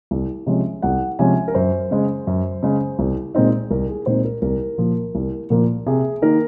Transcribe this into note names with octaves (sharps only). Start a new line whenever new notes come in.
C2
C3 F3 G#3 C#4
C2 F#5
C3 F3 G#3 C#4 G#5
A#4
F#2 C5
C#3 G#3
F#2
C#3 G#3
C2
A#2 G#3 C4 D#4
C2 A#4
G#4
A#2 G#3 C4 D#4 C5
A#4
C2 A#4
A#2 F3 A#3
C2
A#2 F3 A#3
C3 G#4
D#3 A#3 D#4 A#4